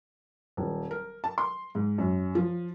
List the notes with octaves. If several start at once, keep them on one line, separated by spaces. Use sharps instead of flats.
D#1
A#4
A5
C6
G#2
F#2
F3